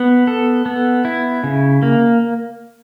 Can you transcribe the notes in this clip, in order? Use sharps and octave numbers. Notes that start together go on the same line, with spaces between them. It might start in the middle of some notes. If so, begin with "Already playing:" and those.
Already playing: B3
A4
B3
E4
C#3
A#3